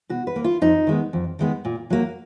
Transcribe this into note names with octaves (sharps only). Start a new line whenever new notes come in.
B2 F#4
B4
A#3
F4
F2 D#4
D#3 G#3 B3
F2
D#3 G#3 B3
A#2
F#3 A#3